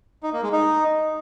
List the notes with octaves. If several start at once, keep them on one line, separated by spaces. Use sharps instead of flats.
D#4
A#3
G#3
D#4